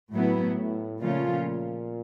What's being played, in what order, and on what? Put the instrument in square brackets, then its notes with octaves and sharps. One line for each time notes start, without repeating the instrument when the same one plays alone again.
[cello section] A2 F#3 B3 E4
[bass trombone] A2
[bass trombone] A#2 [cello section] C#3 F3 A3 C#4 F4